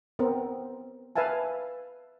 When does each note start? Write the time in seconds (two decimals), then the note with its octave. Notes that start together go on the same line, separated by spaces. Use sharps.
0.19 B3 C4 A#4
1.16 B4 E5 F5 G#5 A5